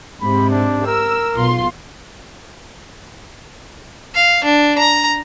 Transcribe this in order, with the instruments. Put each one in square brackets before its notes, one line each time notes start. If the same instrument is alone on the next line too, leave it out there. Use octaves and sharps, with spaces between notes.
[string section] G#2 C3 [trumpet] B5
[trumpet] D4
[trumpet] A#4 [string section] E6
[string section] B1 F4 C6
[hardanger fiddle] F5
D4
A#5